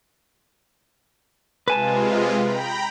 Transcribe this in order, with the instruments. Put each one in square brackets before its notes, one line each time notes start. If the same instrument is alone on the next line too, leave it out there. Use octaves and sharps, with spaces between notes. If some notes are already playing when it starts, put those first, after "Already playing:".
[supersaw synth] C3 G#3 F4 [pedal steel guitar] B4 G#5 A5
[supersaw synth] G5 A#5 B5